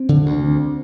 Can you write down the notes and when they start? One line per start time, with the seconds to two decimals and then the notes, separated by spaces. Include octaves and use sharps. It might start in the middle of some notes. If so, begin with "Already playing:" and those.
Already playing: C4
0.09 D3
0.26 D2